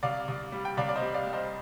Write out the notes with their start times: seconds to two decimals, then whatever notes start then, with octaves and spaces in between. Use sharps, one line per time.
0.03 C2 D5 F5
0.28 C2
0.52 G3
0.65 G5
0.77 C2 D5 F5
0.89 D5
0.95 C5 D#5
1.02 G3
1.14 D5 F5
1.27 G3
1.33 C5 D#5